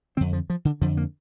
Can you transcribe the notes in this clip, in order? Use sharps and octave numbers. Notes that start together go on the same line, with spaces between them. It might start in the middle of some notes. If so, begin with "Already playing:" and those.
F2 D3 C4
F3
F3
D3
F2 D3 F3
A#3